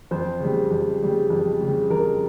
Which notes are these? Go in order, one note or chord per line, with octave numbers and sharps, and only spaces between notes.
F2 C5
C#3 G3
F2
C#3 G3
F2
C#3 G3
F2 A#4